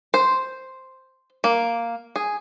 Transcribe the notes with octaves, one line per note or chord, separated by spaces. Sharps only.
C5
A#3
G#4